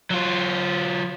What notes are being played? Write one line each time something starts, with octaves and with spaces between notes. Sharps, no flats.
F#3 F4